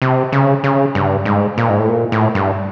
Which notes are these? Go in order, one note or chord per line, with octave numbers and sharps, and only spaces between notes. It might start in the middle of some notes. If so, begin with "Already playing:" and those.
C3
C#3
C#3
G2
G#2
A#2
G#2
A2
A#2
A2
G2